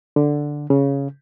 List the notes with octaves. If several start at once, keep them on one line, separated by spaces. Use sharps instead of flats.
D3
C#3